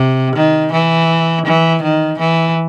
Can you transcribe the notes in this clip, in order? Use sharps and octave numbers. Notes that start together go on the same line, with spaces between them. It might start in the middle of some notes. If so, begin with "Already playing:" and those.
Already playing: C3
D#3
E3
E3
D#3
E3